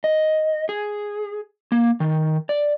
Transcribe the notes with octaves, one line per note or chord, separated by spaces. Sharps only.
D#5
G#4
A#3
D#3
D5